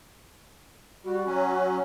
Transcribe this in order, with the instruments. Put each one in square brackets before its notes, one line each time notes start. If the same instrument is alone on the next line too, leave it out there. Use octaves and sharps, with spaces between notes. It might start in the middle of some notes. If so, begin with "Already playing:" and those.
[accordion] G3 [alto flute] F#4
[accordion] F#3 C#4